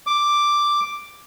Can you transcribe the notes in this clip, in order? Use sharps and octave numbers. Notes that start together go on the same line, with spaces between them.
D6